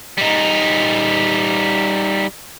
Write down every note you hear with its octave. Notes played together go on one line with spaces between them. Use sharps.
G3 D#4